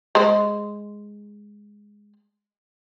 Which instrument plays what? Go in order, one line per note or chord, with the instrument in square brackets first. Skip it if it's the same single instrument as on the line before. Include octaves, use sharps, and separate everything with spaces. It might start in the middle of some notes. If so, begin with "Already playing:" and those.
[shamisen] G#3 C5